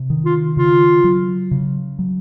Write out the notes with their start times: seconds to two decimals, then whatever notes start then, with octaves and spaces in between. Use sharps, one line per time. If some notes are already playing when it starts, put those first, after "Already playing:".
Already playing: C3
0.10 D#3
0.25 F4
0.57 C#3 F4
1.04 F#3
1.51 C#3
1.99 F#3